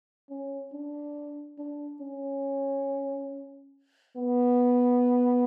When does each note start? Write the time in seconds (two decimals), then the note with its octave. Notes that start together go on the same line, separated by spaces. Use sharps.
0.30 C#4
0.73 D4
1.58 D4
2.01 C#4
4.16 B3